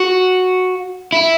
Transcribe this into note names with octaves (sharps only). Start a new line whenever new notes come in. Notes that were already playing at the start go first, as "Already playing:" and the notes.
Already playing: F#4
E4